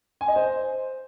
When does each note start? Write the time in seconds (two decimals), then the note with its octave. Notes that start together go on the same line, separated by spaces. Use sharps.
0.21 G#5
0.28 D#5
0.36 C5